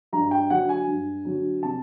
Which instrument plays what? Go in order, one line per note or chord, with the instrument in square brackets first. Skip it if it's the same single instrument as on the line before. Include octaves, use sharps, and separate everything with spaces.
[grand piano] G2 A#5
G5
D3 F#3 F#5
G#5
G2
D3 F#3
C3 A5